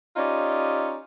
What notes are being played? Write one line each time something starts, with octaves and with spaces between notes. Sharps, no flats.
C#4 D#4 F4 G4 D5 D#5